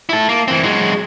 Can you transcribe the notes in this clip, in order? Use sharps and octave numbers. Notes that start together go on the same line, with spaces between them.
E4 A4
A#3
E3 C4
F#3 G#3